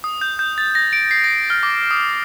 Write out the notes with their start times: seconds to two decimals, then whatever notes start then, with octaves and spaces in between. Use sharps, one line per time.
0.04 D#6
0.21 G6
0.39 G6
0.58 A6
0.75 A#6
0.93 D7
1.11 C7
1.24 A#6
1.50 F6
1.63 D6
1.91 D#6